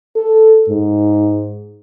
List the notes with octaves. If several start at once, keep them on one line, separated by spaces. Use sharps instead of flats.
A4
G#2